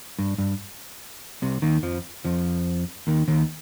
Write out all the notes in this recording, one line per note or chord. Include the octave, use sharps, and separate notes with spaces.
G2
G2
C2 C3
D#2 D#3
F2 F3
F2 F3
D#2 D#3
D#2 D#3